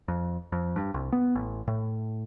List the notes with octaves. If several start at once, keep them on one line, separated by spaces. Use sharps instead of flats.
F2
F2
G2
C2
B3
A1
A2